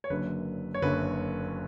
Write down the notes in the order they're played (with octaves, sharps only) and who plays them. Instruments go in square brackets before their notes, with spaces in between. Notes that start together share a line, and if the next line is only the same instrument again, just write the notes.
[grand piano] C#5
F#1 F#2 D3 B4
C#5
F#1 F#2 D3 B4